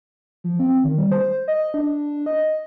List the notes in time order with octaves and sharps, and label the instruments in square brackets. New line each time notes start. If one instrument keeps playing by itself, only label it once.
[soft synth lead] F3
C4
D#3
G3
C5
D#5
D4
D#5